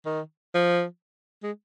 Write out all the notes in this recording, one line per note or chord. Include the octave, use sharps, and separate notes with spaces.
D#3
F3
G#3